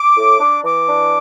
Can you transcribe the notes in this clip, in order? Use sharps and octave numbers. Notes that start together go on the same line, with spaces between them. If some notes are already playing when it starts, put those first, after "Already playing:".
Already playing: D6
A2
D4
E3 D6
D4